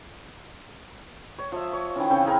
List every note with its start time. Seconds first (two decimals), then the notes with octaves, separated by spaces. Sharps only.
1.39 C#5
1.52 F3 E5
1.73 C#5
1.96 D#3 E3 C#4
2.10 C#3 C4 G5 C#6
2.24 E4 G#4 A#4